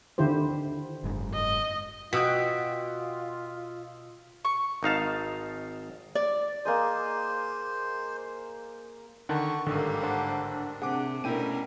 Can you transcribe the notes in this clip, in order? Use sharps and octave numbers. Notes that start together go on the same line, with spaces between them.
D3 D#3 E4 G4 C5
F#1 G#2
D#5
B2 F4 F#4 G5 D#6 E6 B6
C#6
G#1 D#4 F5 A5
D5
A#3 G#4 C5 D#5
D3 D#3 F#5 A5 C#6
A1 G#2 D3 D#3 G3 A#3 A4
D4 C5 F#5 A5
C3 G#4 F#5 D6
B2 G3 A3 C#4 E4 A#4 G5 D#7